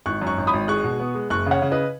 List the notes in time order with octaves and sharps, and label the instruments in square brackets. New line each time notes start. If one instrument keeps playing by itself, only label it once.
[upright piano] G#1 C#6 F#6
F#2
C#6 F#6
G#1
B5 D#6
G#1
G#3 C#6 F#6
B2
B3
G#3
F#1 C#6 F#6
C#3 C#5 F#5
C#3
B4 D#5